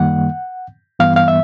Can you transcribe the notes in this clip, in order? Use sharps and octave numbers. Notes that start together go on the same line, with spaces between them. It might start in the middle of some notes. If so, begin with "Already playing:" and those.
Already playing: F#2 D#3 G3 A#3 F#5
G2 E3 G3 B3 F5
F5
E5